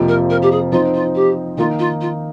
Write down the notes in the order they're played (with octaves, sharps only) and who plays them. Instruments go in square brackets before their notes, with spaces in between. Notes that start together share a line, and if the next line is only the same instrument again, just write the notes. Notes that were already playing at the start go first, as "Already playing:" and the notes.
Already playing: [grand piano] F2 C3 F3 A#3
[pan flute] A#4
A#4
G4
G#4
[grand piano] F3 C4 D#4 [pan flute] F4
[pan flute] F4
G4
[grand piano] D#3 A#3 D#4 [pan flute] F4
[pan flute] F4
F4